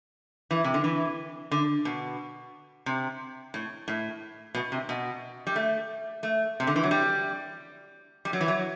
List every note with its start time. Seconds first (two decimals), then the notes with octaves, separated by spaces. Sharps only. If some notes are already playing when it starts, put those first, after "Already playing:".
0.51 E3
0.64 C3
0.74 D3
0.84 E3
1.51 D3
1.85 B2
2.86 C3
3.54 A2
3.88 A2
4.55 B2
4.72 C3
4.89 B2
5.47 G3
5.56 A3
6.23 A3
6.60 C3
6.67 D3
6.76 E3
6.83 F#3
6.91 G3
8.25 G3
8.33 F#3
8.41 E3
8.48 F#3